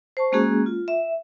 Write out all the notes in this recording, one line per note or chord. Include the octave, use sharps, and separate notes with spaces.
C5 A5 C#6
G#3 A#3 C#4 F#4 G#4
F4
E5